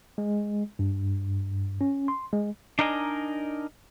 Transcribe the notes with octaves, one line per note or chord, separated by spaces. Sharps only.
G#3
G2
C#4
C6
G#3
D4 D#4 A#4 D#5 G5 G#5